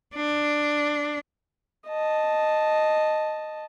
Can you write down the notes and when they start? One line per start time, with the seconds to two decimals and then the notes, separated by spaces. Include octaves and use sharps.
0.15 D4
1.88 D#5 A5